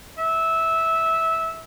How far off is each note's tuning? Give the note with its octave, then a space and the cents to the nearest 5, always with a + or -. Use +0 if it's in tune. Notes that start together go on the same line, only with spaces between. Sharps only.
E5 -15